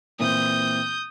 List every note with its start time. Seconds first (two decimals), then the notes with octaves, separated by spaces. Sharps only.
0.19 A#2 E3 C4 D#6 G6